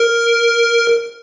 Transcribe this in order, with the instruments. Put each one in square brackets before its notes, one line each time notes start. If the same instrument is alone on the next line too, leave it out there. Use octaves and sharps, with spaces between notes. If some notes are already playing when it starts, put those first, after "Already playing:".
Already playing: [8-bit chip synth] A#4